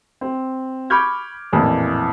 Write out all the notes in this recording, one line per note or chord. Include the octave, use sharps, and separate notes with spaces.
C4
B5 C#6 D6 F6 G6 G#6
A1 F2 A#2 E3